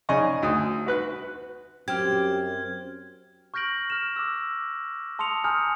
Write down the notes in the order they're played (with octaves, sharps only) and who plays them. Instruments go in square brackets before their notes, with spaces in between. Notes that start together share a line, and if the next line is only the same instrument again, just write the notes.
[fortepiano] C#3 D#4 D5 D#5 G#5 C#6
D2 D#6
F#4 B4 F#6
[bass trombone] F#2 [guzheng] C4 [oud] G4 [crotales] F6 G#6
[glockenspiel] C#6 F6 G6 A#6 D7 F#7
F6 E7
D6 E6
A5 C6 D#6 C#7 F7
G#5 A#5 D#6 F6 G6